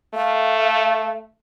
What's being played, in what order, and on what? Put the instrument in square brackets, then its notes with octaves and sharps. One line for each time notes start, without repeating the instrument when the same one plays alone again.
[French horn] A3 [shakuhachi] F5